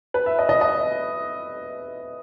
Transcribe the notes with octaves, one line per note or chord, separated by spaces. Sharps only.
B4
E5
D#5
D#5
D#5